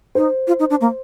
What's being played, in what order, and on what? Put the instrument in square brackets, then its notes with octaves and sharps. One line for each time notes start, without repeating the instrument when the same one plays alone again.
[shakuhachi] D#4 [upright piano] C5
[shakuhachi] F4
D#4
D4
A#3